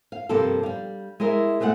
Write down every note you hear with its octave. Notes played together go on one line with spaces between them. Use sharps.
F5
G2 C3 F3 A#3 G4 A4
G3 F5
G#3 E4 G#4 A#4 E5
B2 G#3 A3 D5 F#5